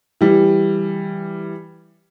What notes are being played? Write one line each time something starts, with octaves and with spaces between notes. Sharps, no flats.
E3 G3